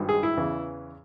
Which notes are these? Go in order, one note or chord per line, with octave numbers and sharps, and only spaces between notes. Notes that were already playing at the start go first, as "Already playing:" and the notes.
Already playing: G#1 G2 D#3
G#4
E4
E2 C#3 E3